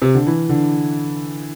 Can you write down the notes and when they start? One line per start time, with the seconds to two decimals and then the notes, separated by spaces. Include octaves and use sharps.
0.02 C3
0.15 D3
0.27 E3
0.49 D3